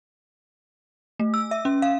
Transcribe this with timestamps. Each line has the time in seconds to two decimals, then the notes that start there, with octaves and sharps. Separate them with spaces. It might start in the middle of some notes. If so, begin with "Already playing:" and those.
1.20 A3
1.34 E6
1.51 E5
1.65 C#4
1.82 F5